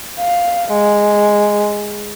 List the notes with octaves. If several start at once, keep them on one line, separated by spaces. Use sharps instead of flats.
F5
G#3